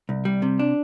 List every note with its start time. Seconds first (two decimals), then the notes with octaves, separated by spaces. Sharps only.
0.09 C2
0.25 G3
0.42 C3
0.59 D4